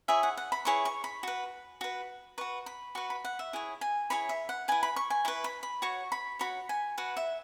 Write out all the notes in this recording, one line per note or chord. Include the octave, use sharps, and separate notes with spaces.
E4 G#4 C#5 E5
F#5
F#5
B5
E4 G#4 C#5 C#6
C#6
B5
F#4 B4
F#4 B4
F#4 B4 C#6
B5
F#4 B4 C#6
B5
F#5
E5
E4 G#4 C#5
G#5
E4 G#4 C#5 B5
E5
F#5
E4 B4 G#5
B5
C#6
G#5
E4 B4 C#6
B5
B5
F#4 C#5 C#6
B5
F#4 C#5 B5
G#5
F#4 B4 F#5
E5